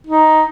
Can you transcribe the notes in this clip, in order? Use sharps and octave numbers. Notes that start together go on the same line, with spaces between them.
D#4